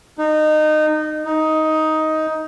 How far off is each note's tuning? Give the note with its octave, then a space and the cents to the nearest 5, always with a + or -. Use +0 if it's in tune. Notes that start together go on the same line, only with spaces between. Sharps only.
D#4 -20
D#4 +10